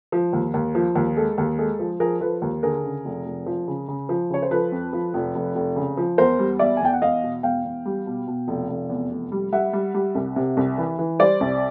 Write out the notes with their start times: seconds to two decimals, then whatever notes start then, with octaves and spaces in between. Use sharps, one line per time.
0.12 F3
0.33 D#2
0.54 D#2
0.75 F3
0.96 D#2
1.17 G#3 A4
1.38 D#2
1.58 G#3 A4
1.79 F3
2.00 F3 G#4 A#4
2.21 F3 A4 B4
2.42 D#2
2.63 D3 G#4 A#4
2.84 C#3
3.05 F1
3.26 F1
3.46 F3
3.67 C#3
3.88 C#3
4.09 F3
4.30 C#3 C#5
4.42 C5
4.51 F3 A4 B4
4.72 F2
4.93 F3
5.14 F1
5.35 F1
5.55 F1
5.76 C#3
5.97 F3
6.18 E2 A#4 C5
6.39 G3
6.59 E2 D5 E5
6.77 G#5
6.81 E2 G5
6.93 F#5
7.02 E2 D#5 F5
7.23 B2
7.43 E2 F5 G5
7.64 E2
7.86 G3
8.06 B2
8.27 B2
8.48 F1
8.69 F1
8.90 E2
9.11 F1
9.32 G3
9.52 G3 E5 F#5
9.73 G3
9.94 G3
10.15 C2
10.36 C3
10.57 C2
10.78 E3
10.99 E3
11.19 G3 C5 D5
11.41 C2